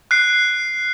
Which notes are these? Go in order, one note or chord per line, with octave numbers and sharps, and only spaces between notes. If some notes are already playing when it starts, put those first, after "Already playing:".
F#6 C7